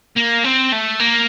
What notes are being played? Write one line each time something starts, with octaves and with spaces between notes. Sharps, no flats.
A#3
C4
A3
A#3